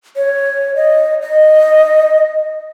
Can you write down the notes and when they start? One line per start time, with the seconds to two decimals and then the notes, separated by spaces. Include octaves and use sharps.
0.17 C#5
0.76 D#5
1.22 D#5